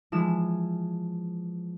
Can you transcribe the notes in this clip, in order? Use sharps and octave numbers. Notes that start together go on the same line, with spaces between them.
E3 F3 G#3 E7